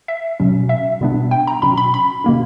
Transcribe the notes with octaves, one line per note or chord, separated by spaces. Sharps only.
E5
B2 F#3 C#4
E5
B2 G3 B3 D4
G5
A#5
B2 F#3 C#4 B5
B5
B5
B2 A#3 C#4